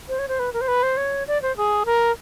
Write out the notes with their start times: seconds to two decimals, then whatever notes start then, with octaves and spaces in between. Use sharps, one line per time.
0.09 C5
0.19 C#5
0.28 C5
0.39 B4
0.53 A#4
0.61 C5
0.68 B4
0.83 C5
0.97 C#5
1.27 D5
1.42 C5
1.57 G#4
1.86 A#4